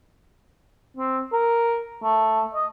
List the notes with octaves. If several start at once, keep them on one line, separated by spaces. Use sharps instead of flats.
C4
A#4
A3
D#5